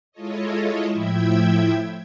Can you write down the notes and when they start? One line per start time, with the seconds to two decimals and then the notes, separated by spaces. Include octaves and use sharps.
0.12 G#3 E4 F4 A4 C#5 D#5
0.89 A2 F3 E4 E5 G5 G#6